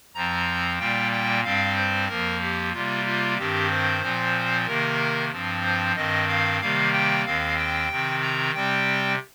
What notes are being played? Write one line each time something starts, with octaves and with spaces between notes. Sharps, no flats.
F2 F3 C4 A#5
A#2 G3 A#3 G5
G5
G2 G3 C4 F5
C5
F2 F3 A#3 A#4
G4
C3 G3 A#3 F4
F4
G2 D#3 C4 G4
C5
A#2 F3 C4
C3 D#3 A#3 A#4
G2 F3 C4
C5
G2 D#3 C4 D#5
F5
C3 D#3 G3 A#3 F5
G5
D#2 D#3 C4 F5
G5
C3 D#3 C4
A#5
C3 G3 C4 G5